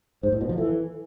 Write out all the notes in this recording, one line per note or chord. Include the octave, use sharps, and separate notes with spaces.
G#2 C5
A2
B2
F3
E3 A4